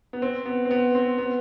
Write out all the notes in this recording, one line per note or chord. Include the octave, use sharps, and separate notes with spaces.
B3
C4
B3
C4
B3
C4
B3